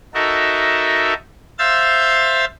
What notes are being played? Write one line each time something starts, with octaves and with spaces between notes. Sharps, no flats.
D#4 F#4 A4 A#4 E5
C5 E5 F5 E6 G6 A6